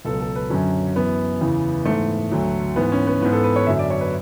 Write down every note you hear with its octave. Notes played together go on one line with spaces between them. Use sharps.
C#2 B2 F#3 A4
A4
B4
F#2 D3 F#3 C#4
F#2 E3 B3
E2 C#3 E3
G#2 E3 A3
D2 D3 F#3
G#2 E3 B3
C#4
B3
G#2 E3 B3
A4
B4
C#5
F#2 D3 F#3 E5
D5
C#5
B4